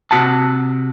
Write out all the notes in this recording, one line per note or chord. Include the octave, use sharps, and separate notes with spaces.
C3 F#4 F#5 A5